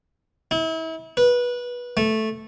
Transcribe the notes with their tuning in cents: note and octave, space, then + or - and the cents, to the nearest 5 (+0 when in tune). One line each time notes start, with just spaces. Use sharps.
E4 -35
B4 -20
A3 -5